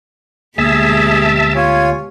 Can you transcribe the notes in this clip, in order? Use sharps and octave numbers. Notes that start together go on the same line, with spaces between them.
D2 B2 G#3 A#3 G4 G#4 E5 A5
F4 C#5 G#5